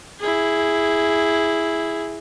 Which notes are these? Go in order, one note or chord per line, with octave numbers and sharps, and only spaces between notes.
E4 G#4